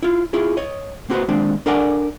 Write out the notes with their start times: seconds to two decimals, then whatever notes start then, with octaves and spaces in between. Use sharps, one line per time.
0.02 E4 F4
0.33 E4 F4 G#4
0.57 C#5 D#5
1.10 A#3 C4 F#4 G#4 B4 C5
1.29 D#2 G#3 C4 D4
1.66 D4 A4 A#4 D5 F#5 G#5